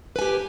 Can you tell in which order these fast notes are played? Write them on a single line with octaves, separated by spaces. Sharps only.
B4 G#5 G4